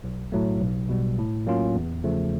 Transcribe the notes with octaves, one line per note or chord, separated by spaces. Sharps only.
B1
A2 F#3 A3
B1
B2 G3
A2
F#3 A#3 C#4 F4
E2
C#3 F3 A3